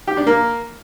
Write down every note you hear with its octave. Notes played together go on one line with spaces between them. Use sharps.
G4
D4
A#3